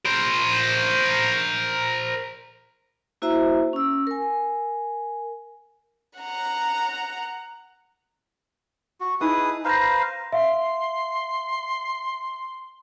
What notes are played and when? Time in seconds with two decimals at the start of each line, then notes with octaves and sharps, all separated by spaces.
0.05 A#4 C5
3.22 A#3 E4 F#4 C5 E5 A#5
3.73 C#4 E6
4.07 A#4 G#5
6.19 F#5 A#5
9.00 F#4
9.21 D#4 E4 G#4 B4 D#6
9.65 B4 C5 F5 A#5 G6 A#6
10.32 E5 F5 C6